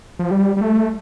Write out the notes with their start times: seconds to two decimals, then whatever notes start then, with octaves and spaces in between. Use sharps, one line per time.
0.19 F3
0.31 G3
0.57 G3
0.61 A3